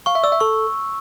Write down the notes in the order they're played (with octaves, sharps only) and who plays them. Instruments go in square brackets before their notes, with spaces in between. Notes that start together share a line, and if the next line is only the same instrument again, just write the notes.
[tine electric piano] F5 [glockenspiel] C#6
[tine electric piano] E5
[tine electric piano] D5 [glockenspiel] E6
[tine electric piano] E5
[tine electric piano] A4 [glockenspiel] C#6